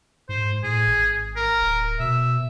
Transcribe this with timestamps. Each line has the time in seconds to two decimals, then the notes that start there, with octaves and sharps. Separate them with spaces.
0.29 G#2 C5
0.63 A2 G#4
0.87 G#1
1.36 A#4
1.61 D1
2.00 B2 E5